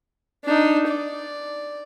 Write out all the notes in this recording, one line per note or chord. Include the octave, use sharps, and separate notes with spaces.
D4 D#4
D5